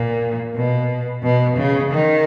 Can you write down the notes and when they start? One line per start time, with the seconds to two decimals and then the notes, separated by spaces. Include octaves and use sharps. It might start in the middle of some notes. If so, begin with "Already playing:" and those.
Already playing: A#2
0.55 B2
1.23 B2
1.57 C#3
1.91 D#3